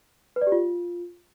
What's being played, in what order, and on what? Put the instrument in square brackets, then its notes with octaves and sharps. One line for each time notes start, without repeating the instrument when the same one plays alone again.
[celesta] B4
D5
G4
F4